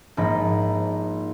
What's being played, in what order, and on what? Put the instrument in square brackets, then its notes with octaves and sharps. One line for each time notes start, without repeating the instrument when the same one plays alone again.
[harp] A#1 G#2 F3 D#4 B5 A#6